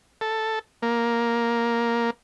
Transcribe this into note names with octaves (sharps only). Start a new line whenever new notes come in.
A4
A#3